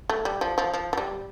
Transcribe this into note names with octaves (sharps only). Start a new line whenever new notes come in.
A3
G3
F3
F3
F3
F3
G3